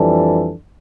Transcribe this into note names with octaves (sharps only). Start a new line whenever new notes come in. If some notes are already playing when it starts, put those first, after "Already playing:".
Already playing: F2 E3 G3 D4 A4